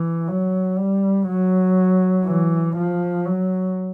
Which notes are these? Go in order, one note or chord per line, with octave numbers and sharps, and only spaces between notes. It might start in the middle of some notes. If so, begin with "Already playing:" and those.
Already playing: E3
F#3
G3
F#3
E3
F3
F#3